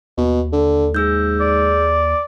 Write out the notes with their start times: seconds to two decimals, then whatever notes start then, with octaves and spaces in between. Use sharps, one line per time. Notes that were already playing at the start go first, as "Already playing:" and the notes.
0.18 D#2 B2
0.52 D3
0.95 G#2 G#4 E6 G6
1.41 D5